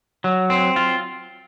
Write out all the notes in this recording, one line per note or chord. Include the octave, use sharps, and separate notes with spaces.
F#3
C4
F4